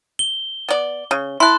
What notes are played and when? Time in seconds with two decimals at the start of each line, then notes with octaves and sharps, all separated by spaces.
0.19 G7
0.69 B3 D5
1.11 C#3
1.40 E4 A4 C6 F#6